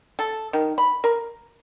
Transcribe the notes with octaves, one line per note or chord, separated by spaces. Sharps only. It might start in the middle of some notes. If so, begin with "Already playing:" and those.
A4
D#3
B5
A#4